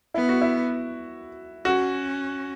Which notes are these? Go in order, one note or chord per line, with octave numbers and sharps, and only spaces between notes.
B3 E4
F#4
E4
C#4 F#4